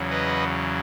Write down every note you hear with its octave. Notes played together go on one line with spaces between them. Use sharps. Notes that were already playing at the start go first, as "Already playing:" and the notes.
Already playing: E2 C#3 F#3
B4 D#5